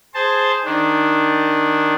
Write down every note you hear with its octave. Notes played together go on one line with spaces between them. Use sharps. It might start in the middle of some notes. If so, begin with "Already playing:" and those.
G#4 C5 A5
D#3 D4